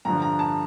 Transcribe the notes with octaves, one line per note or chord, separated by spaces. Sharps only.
G2 D3 F3 A#5
A#5
A5